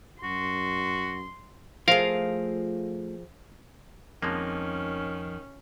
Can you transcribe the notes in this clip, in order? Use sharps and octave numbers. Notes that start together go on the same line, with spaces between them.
F#2 F#4 C6
F3 A3 F4 G#4 A#4 F5
F2 D#3 F3 G#3 A#3 C#4